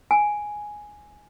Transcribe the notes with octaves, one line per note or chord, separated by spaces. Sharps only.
G#5